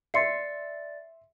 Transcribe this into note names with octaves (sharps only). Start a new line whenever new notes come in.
D5 E5 C6 A6 C7 C#7